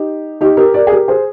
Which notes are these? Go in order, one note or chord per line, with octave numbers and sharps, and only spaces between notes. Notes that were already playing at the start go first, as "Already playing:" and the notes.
Already playing: D#4 G4
D#4 G4
G4 A#4
A#4 D5
G#4
G4 A#4
G#4 C5